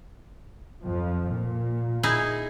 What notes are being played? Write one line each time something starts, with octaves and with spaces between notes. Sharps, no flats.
F2 F3
A#2
D#4 E4 G#4